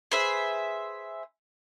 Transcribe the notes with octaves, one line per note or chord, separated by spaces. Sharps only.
G#4 B4 C5 E5